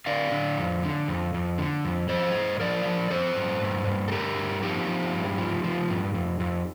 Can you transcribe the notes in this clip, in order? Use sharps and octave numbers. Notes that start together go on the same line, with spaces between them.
D3 D5 F5
D3
F2
D3
F2
F2
D3
F2
F3 C5 D#5
G2
F3 A#4 D5
F3
F3 A4 C5
G2
G2
G2
A4
D3 G4 A#4
G2
F3 D#4 G4
F3
G2
F3
F3
G2
F2
F2